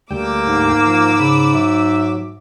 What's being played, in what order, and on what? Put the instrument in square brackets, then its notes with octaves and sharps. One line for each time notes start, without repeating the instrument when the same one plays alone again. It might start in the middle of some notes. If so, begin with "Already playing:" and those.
[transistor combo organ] D2 G3 G5 [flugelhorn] A#3 [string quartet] D6 E6
[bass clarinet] G#2
[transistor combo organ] F3
C#3 B5
[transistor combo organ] F#3 [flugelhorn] E5